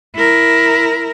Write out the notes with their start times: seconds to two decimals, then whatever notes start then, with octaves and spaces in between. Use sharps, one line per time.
0.16 E4 A#4